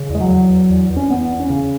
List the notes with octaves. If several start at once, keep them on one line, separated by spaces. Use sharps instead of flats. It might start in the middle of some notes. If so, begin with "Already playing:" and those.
Already playing: C#3
E2 G#3
F#3
E2
E2
E2
E2
C#4
E2 B3
E2
C#4
C#3